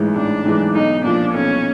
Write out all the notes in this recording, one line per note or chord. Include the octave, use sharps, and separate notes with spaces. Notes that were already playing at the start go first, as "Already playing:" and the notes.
Already playing: A1 G#2 E3 G#3
A1 D4
G#2 E3 G#3
B1 D#4
A#2 F3 D4
B1 C#4